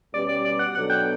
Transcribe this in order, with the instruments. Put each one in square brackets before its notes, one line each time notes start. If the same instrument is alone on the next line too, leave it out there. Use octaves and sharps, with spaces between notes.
[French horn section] B2 G3 C#4 G4 B4 [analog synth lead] D5
[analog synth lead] D5
D5
F#5
[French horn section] B2 F#3 B3 D4 A4 [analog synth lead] F#5
[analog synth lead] G5